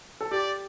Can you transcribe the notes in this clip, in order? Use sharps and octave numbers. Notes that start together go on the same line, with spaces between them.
A4
G4 D5